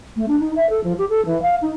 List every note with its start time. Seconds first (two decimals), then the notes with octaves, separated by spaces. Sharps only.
0.16 A3
0.28 D4
0.40 D#4
0.56 E5
0.70 A4
0.83 F3
0.98 G4
1.09 A4
1.25 E3
1.42 F5
1.62 D#4